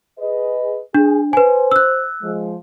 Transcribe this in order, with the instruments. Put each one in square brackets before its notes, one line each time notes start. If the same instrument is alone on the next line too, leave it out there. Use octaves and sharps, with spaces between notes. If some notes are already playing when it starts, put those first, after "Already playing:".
[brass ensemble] G#4 B4 D#5
[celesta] D4 [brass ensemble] G#4
[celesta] B4 G#5 [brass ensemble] C5
[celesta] E6 F#6
[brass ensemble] F3 G#3